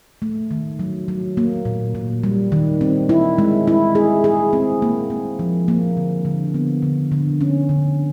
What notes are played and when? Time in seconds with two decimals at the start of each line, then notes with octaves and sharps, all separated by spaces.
0.22 A3
0.51 D#3
0.79 F#3
1.08 F#3
1.37 A#3
1.65 A#2
1.95 A#2
2.24 G3
2.52 D#3
2.81 C4
3.09 E4
3.38 G#3
3.67 E4
3.95 G#4
4.24 G#4
4.53 C4
4.82 A#3
5.10 A#3
5.39 F3
5.68 A#3
5.97 D3
6.25 D3
6.54 B3
6.83 D3
7.12 D3
7.41 C#4
7.69 D3